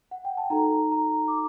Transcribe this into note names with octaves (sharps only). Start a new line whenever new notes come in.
F#5
G5
A5
D#4 F#4 A4 A#5
A#5
D6